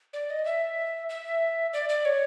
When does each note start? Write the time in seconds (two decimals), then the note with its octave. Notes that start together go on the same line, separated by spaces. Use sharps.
0.13 D5
0.30 D#5
0.45 E5
1.09 E5
1.73 D5
1.89 D5
2.05 C#5